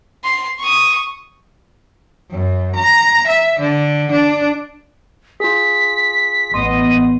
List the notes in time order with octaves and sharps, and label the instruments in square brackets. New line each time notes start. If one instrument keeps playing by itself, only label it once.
[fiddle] C6
C#6 D#6
[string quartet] F#2
A#5
E5
D3
D4
[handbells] F4 G#4 [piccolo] B6
[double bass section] A1 B3 [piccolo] D#5 [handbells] C6